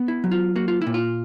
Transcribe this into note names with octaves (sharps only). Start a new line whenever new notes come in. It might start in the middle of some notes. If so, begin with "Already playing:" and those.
Already playing: B3
E4
F#3
F4
A#3 F#4
F4
A#2 E4
F4